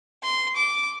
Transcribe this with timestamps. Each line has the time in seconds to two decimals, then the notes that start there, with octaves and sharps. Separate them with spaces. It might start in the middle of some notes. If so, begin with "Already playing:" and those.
0.23 C6
0.56 D6